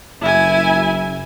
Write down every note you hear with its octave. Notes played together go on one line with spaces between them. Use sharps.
F#1 E4 G#5